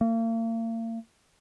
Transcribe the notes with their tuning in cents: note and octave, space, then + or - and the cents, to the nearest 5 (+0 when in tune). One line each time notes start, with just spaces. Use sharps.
A#3 -40